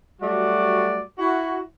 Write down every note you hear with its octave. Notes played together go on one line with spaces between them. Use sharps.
F#3 G3 A3 F#4 D5
E4 F#4